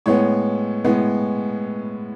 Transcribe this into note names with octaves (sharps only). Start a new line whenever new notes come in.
A2 G#3 B3 C#5
A2 G#3 B3